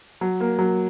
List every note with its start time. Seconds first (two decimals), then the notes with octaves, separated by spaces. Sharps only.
0.21 F#3
0.40 A#3
0.59 F#3